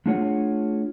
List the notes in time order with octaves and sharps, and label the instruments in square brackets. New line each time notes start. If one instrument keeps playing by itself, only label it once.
[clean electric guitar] A3 D4 F4 F#4 G#4 C#5